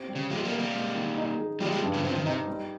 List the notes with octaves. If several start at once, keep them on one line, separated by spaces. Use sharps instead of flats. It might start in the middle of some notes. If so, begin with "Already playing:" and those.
Already playing: C4 G4
G3
C#3
F3 G#3 G4
G3 A#3
A#4
G3 A#3
G#3
D#3
D#4
G#4
F3 G3 G#3
F3 G#3
G2
C#3 F3
C#3 F3 C4
D#3
C3 D#4
G3